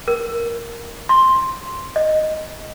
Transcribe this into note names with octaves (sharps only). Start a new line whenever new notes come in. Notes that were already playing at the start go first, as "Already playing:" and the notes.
A#4
C6
D#5